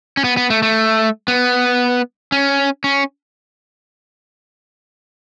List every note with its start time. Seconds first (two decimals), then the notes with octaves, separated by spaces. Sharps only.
0.17 C#4
0.24 B3
0.37 B3
0.50 A3
0.63 A3
1.28 B3
2.32 C#4
2.84 C#4